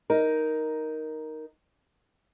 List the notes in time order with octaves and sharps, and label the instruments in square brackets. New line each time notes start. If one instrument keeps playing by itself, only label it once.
[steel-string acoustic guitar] D#4 A#4